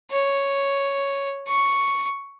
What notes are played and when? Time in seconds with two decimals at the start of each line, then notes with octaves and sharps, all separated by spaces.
0.11 C#5
1.48 C#6